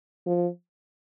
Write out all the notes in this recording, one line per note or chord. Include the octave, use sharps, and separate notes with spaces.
F3